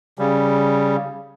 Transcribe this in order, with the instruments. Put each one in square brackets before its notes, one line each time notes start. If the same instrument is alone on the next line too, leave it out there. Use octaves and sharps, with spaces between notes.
[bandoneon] C#3 G3